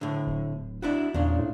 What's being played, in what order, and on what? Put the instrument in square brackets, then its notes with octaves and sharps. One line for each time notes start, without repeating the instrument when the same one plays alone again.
[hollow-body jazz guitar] A2 D3
[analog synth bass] D1
[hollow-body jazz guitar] D4 E4 F#4
[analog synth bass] E2 [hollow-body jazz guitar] A#2 C#3 D4
[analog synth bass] A2